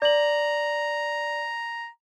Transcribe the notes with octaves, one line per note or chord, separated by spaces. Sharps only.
D5 A#5 F#7